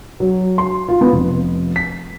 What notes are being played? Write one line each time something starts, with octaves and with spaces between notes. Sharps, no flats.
F#3
C6
F4
B3
F1
B6